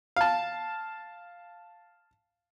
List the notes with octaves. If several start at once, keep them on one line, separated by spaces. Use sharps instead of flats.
F5 A5